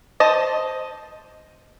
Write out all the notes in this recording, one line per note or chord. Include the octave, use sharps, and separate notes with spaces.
C5 D#5 A5